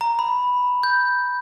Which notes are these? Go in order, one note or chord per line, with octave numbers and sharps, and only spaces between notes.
A#5
B5
G6